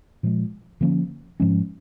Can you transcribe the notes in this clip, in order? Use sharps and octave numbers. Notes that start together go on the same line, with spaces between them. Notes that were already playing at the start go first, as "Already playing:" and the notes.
A#2 F3 G#3
D3 F3 A#3 C#4
G#2 F3 G#3 C#4